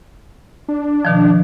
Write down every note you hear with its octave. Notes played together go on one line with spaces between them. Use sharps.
D4
B2 D#3 F3